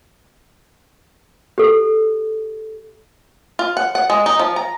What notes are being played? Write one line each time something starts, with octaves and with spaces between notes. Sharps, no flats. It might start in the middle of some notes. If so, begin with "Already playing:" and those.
G4 A4
F4
F#5
F#5
G#3
D#4
F3
A#5